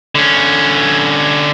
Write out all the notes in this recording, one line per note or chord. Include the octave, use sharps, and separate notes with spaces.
D3 C#4